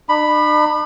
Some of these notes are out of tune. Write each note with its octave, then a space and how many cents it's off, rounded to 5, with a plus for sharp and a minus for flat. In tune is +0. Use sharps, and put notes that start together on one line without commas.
D4 +45 B5 +0